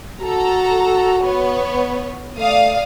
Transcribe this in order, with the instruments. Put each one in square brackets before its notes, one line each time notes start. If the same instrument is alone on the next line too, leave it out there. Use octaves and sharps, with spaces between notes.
[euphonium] F#4 [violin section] A4 A#5
[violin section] B3 C#5
[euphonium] A3 [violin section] D5 F5 D#6